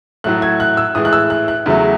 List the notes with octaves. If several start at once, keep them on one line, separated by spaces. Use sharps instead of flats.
A2 F#3 A3 F#6
G#6
F#6
E6
A2 E3 G#3 D#6
F#6
E6
F#6
F#6
E2 C#3 F#3 A3